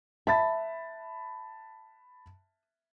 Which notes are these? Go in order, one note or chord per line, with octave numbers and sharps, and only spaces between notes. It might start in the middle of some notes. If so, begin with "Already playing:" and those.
E5 A5 B5 A6